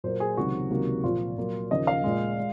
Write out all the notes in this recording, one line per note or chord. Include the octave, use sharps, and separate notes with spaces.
A#2 F#3 A#3 C5
G#4
C#2 C3 D#3 F#3 F#4
C#2 C3 D#3 F#3 A#3
A#2 F3 A#3 F4
A#2 F#3 A#3
D#2 C#3 F3 A#3 D#5
F5
A#2 G#3
G#3